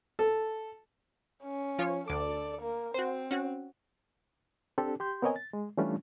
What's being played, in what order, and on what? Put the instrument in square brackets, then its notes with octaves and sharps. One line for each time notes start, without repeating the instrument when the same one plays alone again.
[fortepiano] A4
[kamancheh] C#4
[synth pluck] F3 F4 C#5
[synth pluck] D2 D6 [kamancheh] A4 D5
[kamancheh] A#3 A#4
[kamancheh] C4 [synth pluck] F#4 C5
[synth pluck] C#4 F#4
[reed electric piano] C4 D4 G4 A4
G4 C6 G6
B3 C4 A#4 C#5 D#5 G#5
A6
G#3
E3 G3 A3 C#4 D4 F4